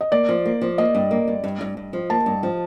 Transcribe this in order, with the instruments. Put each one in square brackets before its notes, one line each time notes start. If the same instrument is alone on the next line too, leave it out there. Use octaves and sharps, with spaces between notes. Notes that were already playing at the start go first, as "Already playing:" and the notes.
[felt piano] D#5
[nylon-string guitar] A#3 [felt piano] D5
[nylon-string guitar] F3
A#3
F3
[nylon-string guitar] A#3 [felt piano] D#5
[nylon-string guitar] G2
A#3
G2
G2
G2
G2
F3
[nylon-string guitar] A#3 [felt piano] A5
[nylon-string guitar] G2
F3